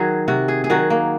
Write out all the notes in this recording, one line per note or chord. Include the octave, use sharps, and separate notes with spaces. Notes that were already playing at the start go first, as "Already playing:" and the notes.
Already playing: D#3 F#3 F#4 G#4
C3 F#4
G#4
G#4
D#3 F#3 F#4
A#3